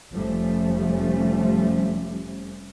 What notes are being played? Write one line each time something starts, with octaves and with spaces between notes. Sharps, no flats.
F1 F3 G3 A3 C#4